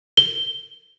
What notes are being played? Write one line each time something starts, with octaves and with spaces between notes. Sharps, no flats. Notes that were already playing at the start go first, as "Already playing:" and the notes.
G7